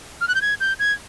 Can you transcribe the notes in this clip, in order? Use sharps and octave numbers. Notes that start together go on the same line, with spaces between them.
F6
F#6
G6
G#6
G6
G#6